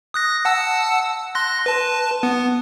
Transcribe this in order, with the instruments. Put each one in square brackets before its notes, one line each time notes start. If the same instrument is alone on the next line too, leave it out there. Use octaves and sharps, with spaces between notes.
[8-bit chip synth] D#6 F#6 A#6
F#5 A5 E6
C6 F#6 A#6
B4 A5
B3